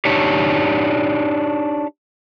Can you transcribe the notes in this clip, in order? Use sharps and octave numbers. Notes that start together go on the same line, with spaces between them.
D4 D#4 G4 C#5